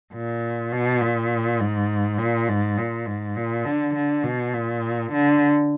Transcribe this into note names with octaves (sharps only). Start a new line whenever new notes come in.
A#2
B2
A#2
G#2
A#2
G#2
A#2
G#2
A#2
D3
D3
B2
A#2
D3